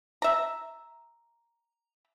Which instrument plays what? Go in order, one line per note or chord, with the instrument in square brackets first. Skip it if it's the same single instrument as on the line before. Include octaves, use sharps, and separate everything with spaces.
[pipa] E5 A#5